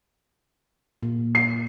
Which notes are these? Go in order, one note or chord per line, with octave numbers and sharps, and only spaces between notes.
A#2
C7